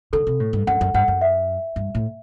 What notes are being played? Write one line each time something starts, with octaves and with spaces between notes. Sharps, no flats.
D3 A4
C3
A2
G2
F#2 F#5
F#2
G2 F#5
F#2
E5
G2
A2